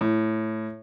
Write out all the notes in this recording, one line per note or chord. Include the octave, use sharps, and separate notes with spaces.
A2